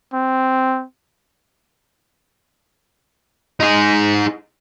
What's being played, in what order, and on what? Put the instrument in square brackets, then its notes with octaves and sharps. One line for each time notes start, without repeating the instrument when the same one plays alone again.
[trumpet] C4
[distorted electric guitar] D#4 G#4